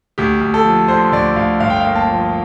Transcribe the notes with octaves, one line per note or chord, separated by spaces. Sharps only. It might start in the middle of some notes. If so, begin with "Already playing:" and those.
D2 G4
D2
A4
F3
D3 C5
D2 D5
D2 F5
G1 F5
G5
A#3 F5
A5
F3